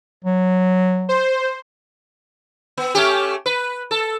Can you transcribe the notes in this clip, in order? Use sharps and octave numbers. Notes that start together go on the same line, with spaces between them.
F#3
C5
B3
A3 C#4 G4
B4
A4